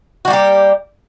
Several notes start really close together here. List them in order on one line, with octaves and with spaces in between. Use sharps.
F#4 G3 A#3 G4